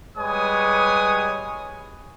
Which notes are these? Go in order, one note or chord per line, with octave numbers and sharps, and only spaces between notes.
G3 G#3 B4 C#5 G#5 D#6